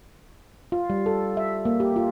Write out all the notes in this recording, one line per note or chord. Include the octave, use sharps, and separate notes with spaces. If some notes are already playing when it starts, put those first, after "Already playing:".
F4
G3
A4
E5
A#3
G4
F4